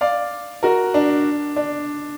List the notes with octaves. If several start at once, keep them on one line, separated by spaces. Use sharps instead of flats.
D5 F5
F#4 A#4
D4
D4